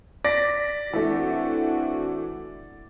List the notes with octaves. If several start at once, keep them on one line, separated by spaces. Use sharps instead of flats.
D5 A#6 B6
E3 A3 C4 D4 F#4